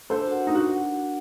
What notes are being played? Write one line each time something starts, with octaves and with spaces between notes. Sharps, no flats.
D4 A4 C5
F#4 A#4 F#5
D4 D#4
F#4